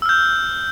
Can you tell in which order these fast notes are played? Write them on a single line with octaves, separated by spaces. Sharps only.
E6 F6 G6